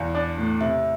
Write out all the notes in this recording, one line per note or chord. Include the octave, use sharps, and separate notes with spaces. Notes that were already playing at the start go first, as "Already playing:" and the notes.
Already playing: E2 F5
D4
A2
C3 E5